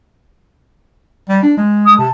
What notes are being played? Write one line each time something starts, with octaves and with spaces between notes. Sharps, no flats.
G3
D4
G#3
D#6
C3 A5